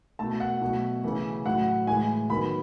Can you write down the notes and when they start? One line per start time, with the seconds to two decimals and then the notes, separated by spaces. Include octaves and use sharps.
0.19 B2 A3 A5
0.40 F#5
0.61 B2 F#3 A3
1.03 C#3 E3 A3
1.45 A2 F#3 A3 F#5
1.87 A2 E3 G#3 G#5
2.29 D#3 F#3 B3 B5